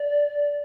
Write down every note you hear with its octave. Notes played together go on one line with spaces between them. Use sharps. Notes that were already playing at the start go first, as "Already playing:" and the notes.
Already playing: D5